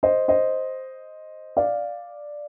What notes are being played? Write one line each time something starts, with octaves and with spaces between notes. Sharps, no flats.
C5 D#5
C5 D#5
D5 F5